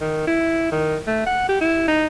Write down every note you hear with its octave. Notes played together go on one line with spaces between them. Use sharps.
D#3
E4
D#3
A3
F#5
G4
E4
D#4